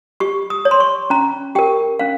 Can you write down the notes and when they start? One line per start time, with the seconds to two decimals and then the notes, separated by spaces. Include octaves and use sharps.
0.20 G4 C#6
0.50 D#6
0.65 C#5
0.71 C6
0.80 C#6
1.10 C#4 A#5
1.55 G4 A#4 G5
1.99 C#4 F5